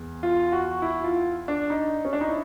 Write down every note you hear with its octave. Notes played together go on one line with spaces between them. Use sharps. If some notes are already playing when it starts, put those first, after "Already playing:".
Already playing: E2
F4
F#4
E4
F4
D4
D#4
C#4
D4
D#4
E4